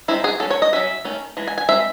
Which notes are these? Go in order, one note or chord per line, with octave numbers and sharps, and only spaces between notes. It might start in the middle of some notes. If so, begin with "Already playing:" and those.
D#3 G#3 C4 D#4 E4
G#4
F#3 C#4 A4
C#5
D#5
F#3 C#4 E5
D#3 A3 C#4
E3 G#3
G#5
G#5
G#3 C4 E5